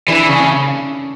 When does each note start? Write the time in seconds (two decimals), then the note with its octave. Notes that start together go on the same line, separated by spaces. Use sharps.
0.08 E3 D4
0.29 C#3
0.39 C#4